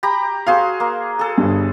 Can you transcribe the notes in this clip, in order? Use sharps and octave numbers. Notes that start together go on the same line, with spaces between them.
G4 A#5 B5
F#4 G#4 C5 F5
A#3
G#4 A4
G1 G2